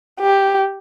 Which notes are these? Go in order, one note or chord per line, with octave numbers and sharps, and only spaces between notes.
G4